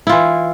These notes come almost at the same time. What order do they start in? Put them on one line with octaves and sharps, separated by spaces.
E4 F4 E3